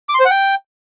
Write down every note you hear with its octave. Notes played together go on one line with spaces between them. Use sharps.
D6
C6
C5
F#5
G5